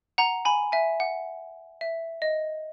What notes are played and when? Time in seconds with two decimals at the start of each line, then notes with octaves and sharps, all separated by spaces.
0.18 F#5 A#5
0.45 G#5 B5
0.72 E5 G#5
1.00 F#5
1.81 E5
2.22 D#5